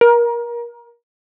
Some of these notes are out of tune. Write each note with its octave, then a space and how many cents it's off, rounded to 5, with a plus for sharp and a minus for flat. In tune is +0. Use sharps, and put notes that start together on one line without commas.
A#4 +25